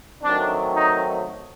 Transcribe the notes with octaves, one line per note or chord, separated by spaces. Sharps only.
D#3 F#3 A3 C4 D4
D#4